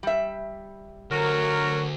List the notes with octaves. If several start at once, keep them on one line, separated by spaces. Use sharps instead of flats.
G3 E5
D2 F#3 A#4